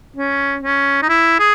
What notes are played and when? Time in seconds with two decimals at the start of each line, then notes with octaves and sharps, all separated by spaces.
0.17 C#4
0.63 C#4
1.02 D#4
1.09 E4
1.39 G#4